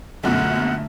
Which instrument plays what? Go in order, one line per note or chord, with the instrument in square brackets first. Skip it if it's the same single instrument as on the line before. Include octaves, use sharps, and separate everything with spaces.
[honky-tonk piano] A#1 F#2 B2 [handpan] D3 A3 [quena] F#5